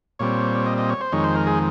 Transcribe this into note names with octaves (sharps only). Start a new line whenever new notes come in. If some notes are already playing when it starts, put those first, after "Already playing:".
A#2 G3 C4 C#5
D#5
D#5
C#5
C5
F2 D#3 G#3 C#5
C5
A#4
G#4